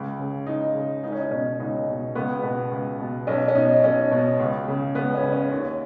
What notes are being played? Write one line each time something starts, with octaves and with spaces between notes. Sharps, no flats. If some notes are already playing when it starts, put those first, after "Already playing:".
Already playing: C#2
C#3
C#2 D#4
C#3
C#2 D#4
C#4
D#4
B2 C#4
C#2 D#4
B2
C#2 B3
B2 B3
C#2
B2
B1 C#4
C#4
B2 D#4
B1 C#4
B2
C#2
C#3
C#2 B3
C#4
C#3
C#4
D#2